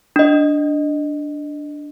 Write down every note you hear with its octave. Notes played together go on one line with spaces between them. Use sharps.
D4 D#5